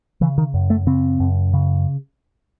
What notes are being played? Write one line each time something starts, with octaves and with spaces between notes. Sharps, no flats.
C#3 E3
D#3
F#2
A3
C#3 C4
F#2
C#3